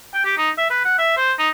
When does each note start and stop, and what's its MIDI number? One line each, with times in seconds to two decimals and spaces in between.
0.14 0.23 79
0.25 0.36 67
0.38 0.50 63
0.58 0.66 76
0.70 0.84 71
0.85 0.97 78
0.98 1.15 76
1.17 1.33 72
1.39 1.49 63